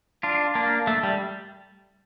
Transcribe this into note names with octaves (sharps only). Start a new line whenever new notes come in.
D4 F4
A#3 D4
A3
G3